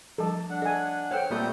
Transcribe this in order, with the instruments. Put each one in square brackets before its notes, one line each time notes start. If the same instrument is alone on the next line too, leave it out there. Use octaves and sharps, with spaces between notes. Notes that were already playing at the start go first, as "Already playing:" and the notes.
[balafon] F3 G3 [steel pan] A4 A5
[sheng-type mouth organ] D4 F#5
[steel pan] A4 G#5 [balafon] D#5
[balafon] A4 C5 C#5 [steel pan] F#5 G5 [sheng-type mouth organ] F6
[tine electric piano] A#2 G3 A3 [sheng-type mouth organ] C4 D#6 G6